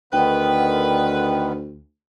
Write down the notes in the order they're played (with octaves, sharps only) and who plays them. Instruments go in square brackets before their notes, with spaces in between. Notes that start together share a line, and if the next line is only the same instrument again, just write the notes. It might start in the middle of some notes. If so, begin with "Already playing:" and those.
[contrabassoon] D2 [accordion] D3 D#3 B3 [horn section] B4 [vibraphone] G5